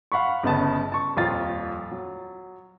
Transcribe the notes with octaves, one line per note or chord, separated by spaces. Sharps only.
F5 F#5 B5 C#6
G1 C#3 B3 D#5 A5
A5 C#6
D#1 F2 F4 A6
F#3